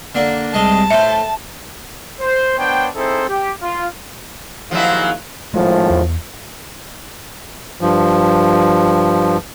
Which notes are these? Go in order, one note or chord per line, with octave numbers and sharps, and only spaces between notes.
D3 A#3 D4
C2 G#3 D#5 A5
A2 C5 E5
C5
B3 D4 C5 C#5 G5
C4 D#4 E4 G#4 A4 C5
G4
F4
D#2 G#2 F3 F#3 E4 F5
G#1 A2 F3 G#3 A3
E2
G2 F3